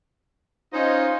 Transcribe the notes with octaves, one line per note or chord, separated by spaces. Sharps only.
C#4 D#4 F4 C5 D#5